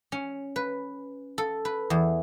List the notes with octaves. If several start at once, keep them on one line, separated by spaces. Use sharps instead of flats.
C#4
B4
A4
B4
E2